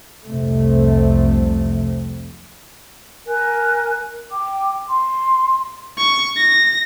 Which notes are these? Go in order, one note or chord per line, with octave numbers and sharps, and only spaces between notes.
C2 F2 C3 A3
A#4 G#5 F#6
G5 D6
C6
C#6
A#6